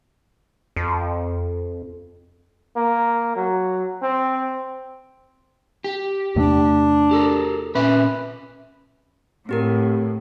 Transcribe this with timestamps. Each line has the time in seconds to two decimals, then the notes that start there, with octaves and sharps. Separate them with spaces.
0.76 F2
2.76 A#3
3.36 F#3
4.03 C4
5.84 G4
6.36 E2 C3 A3 D4
7.11 G4 A4 A#4
7.75 A#2 C#4 B4 E5
9.49 A2 C4 G4 A#4